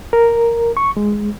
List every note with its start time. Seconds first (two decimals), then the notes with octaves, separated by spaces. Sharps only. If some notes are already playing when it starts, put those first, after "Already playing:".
0.13 A#4
0.77 C#6
0.97 G#3